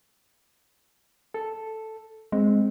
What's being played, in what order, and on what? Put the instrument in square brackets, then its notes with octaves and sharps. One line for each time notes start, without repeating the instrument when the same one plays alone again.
[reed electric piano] A4
[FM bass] G#3 [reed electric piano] C4